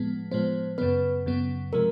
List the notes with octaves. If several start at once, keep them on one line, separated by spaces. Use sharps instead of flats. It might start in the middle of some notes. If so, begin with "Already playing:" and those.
Already playing: A2 F3 G#3 B3
A2 F3 G#3 B3 C5
F#2 C#3 F#3 B3 B4
F#2 C#3 F#3 B3
C3 F3 G#3 A#4